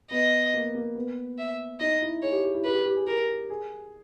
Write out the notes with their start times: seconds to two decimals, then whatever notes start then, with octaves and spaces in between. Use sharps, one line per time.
0.11 B3 D#5
0.54 A#3
0.74 A#3
0.95 B3
1.38 E5
1.80 D#4 D#5
2.02 E4
2.22 G#4 C#5
2.32 G4
2.44 G4
2.55 E4
2.64 G4 B4
2.75 G4
2.86 G4
2.96 G#4
3.07 G4 A#4
3.50 G#4